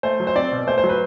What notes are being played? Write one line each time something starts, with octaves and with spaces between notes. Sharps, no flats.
A3 C5
F#3
C5
C4 D5
B2
A3 C5
C5
F#3
B4